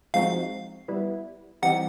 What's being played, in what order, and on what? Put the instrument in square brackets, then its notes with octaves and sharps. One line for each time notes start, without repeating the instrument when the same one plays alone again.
[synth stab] F3 G#3 C4 D#4 F#4 [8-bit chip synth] F5
[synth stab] G3 B3 E4
[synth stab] E3 G3 C4 D#4 G4 [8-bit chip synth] F#5